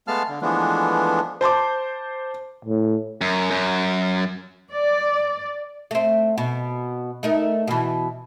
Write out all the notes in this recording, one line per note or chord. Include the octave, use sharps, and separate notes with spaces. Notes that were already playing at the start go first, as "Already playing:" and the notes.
G#3 A3 B3 F5 A5 F6
D3
E3 F3 G#3 A3 B3 D4
C5 A5 C6 D6
A2
F#2
F#2
D5
A3 C4
B2
A3 D#4 A#4
B2 E3